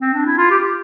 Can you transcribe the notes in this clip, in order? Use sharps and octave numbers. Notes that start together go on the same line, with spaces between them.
C4
D4
E4
F4
G4